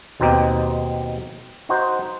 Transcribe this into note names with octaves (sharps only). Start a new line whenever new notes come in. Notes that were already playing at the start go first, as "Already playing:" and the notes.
D#2 B2 C4 D#4 G4
D#4 F#4 C5